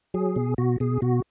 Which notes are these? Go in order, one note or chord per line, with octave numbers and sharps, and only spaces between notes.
F#3 G#4
B2
B2 F#4
B2 G#4
B2 F#4